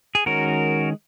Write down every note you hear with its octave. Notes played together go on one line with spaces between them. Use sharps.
G#4
D#3 G#3 C#4 F#4 A#4